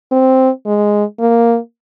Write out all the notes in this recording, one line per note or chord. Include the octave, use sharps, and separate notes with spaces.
C4
G#3
A#3